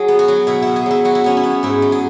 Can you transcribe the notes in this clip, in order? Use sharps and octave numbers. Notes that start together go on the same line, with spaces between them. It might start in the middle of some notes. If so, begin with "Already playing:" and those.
Already playing: F#3 G#4
B3
F#4
F#3
B2 E4
B2 E4
G#4
F#3 E4
F#3 F#4
E4
B3 C#4
E4
B3
G#2 E4
F#3
G#4